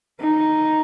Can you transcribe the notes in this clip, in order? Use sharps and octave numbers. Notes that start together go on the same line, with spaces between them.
D#4